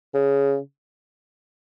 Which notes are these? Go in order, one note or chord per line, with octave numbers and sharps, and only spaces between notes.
C#3